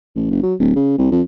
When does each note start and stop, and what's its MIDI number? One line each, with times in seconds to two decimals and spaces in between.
0.15 0.27 33
0.30 0.40 30
0.43 0.54 54
0.60 0.74 26
0.76 0.94 49
0.98 1.10 36
1.11 1.21 41